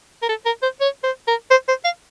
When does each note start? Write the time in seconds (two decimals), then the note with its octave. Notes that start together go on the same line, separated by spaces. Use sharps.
0.22 A#4
0.29 A4
0.46 A#4
0.63 C5
0.81 C#5
1.04 C5
1.28 A#4
1.51 C5
1.68 C5
1.85 F5